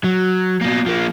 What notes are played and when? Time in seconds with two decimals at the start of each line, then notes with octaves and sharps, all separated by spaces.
0.04 F#3
0.61 B2 A#3
0.86 F3 A#3